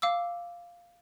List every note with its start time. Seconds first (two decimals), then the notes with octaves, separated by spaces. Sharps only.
0.02 F5 D6 E6